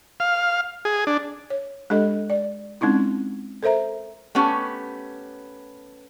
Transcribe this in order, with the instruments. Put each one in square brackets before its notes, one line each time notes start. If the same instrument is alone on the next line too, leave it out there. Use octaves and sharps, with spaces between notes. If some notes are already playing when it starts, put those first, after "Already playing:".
[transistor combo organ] F5
G#4
D4
[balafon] C#5
G#3 D4 G4 A4 D#5
D5
G#3 C4 C#4 D#4 E4
A4 A#4 C5 E5 A#5
[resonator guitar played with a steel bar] A3 B3 C#4 G4